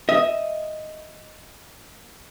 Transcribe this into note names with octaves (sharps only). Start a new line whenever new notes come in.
D#5 E5